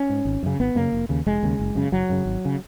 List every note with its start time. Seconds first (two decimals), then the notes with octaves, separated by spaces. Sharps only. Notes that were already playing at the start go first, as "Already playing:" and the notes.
Already playing: C#4
0.10 G#2
0.25 G#1
0.43 F#2 C#3
0.60 G#1 B3
0.75 F#2 C#3 A#3
0.92 F1
1.09 D#2 C#3
1.26 F1 G#3
1.43 D#2 C#3
1.59 F#1
1.75 F#2 C#3
1.92 F#1 F#3
2.09 F#2 C#3
2.26 G#1
2.45 C#3